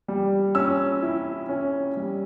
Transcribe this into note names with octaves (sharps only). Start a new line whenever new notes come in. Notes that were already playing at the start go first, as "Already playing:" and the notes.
G3
C#4 E6
E4
C#4
G3